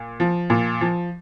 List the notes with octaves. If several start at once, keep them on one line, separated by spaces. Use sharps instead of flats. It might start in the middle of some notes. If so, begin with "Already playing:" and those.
Already playing: A#2
F3
A#2
F3